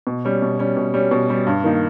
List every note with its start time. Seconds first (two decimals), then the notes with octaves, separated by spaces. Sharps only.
0.07 B2
0.25 G3 C#4
0.42 B2
0.59 G3 C#4
0.77 B2
0.94 G3 C#4
1.11 B2
1.29 G3 C#4
1.47 G2
1.64 D#3 A#3 D#4